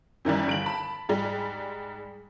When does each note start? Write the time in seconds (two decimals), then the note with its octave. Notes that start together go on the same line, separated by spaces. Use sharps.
0.25 F#2 D#3 E3 G3
0.47 G1 D7 F#7
0.66 A5 B5
1.09 G#2 G3 G#3